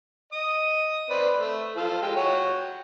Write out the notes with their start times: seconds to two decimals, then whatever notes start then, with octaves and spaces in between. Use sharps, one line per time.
0.33 D#5 D#6
1.10 C4 B4 D5
1.38 A3
1.77 F3 A4 F5
2.02 G#3 G4
2.16 F#4 C#5 G5